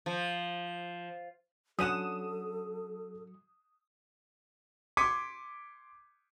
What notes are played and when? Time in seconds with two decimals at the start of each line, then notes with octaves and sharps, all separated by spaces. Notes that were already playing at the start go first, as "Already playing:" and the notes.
0.06 F3
1.79 D3 F#3 C#4 A4 F#5 D#6 D#7 E7
4.97 C6 D6 G#6 B6 C#7 D#7